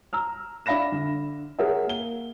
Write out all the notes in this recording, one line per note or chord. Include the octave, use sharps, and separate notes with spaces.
A#5 E6 F6
D4 E5 F5 B5 A#6 E7
D3
G#4 A#4 C#5 E5 F#5
A#3 G7